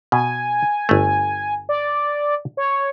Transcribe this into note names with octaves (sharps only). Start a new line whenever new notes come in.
B2 G#5
G1 A3
D5
C#5